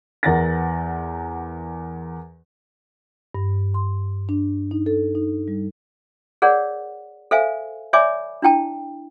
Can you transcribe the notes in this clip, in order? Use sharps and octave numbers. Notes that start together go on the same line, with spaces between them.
E2 A#4 F#5 A6 A#6
G2
C6
D4
D#4
A4
D#4
G3
G#4 A#4 C#5 D5 F#5
A4 C5 E5 F5 G#5
C#5 D5 E5 G#5 B5 D6
D4 E4 G5 A5